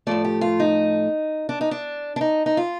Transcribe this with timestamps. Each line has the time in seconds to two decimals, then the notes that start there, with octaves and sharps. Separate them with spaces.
0.07 A2 F3 A3 D5
0.25 G4
0.41 F4
0.60 D#4
1.49 D4
1.61 D#4
1.71 D4
2.16 D4
2.21 D#4
2.46 D#4
2.57 F4